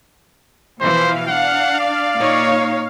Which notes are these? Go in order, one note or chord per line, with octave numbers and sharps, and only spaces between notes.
B2 E3 F3 C5 F5
D4 F#5
D5
A#2 D#4 C#5